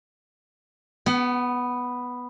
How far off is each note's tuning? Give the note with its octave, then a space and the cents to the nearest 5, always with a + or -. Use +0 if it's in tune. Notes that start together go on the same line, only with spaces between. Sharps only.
B3 +0 F#5 +35